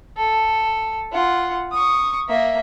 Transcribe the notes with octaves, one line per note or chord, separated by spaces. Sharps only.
A4
F4 F#5
C#6 D#6
A#3 E5